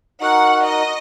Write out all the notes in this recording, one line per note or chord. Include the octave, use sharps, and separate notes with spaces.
D#4 F#4 A#4 F#5
D#5